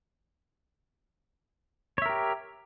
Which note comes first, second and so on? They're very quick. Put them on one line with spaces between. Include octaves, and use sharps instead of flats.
C#5 E5 A#4 G4